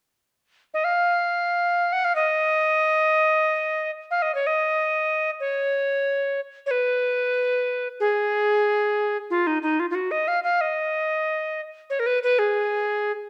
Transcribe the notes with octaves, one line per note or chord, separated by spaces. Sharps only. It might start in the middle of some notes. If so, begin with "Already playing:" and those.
D#5
F5
F#5
F5
D#5
F5
D#5
C#5
D#5
C#5
C#5
B4
G#4
F4
D#4
D#4
F4
F4
F#4
D#5
F5
F5
D#5
C#5
A#4
B4
B4
G#4